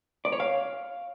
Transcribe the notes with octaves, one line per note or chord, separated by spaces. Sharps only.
D5
C#5
F5